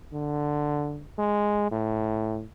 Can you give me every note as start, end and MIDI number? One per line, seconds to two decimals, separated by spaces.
0.13 1.05 50
1.19 1.71 56
1.71 2.44 45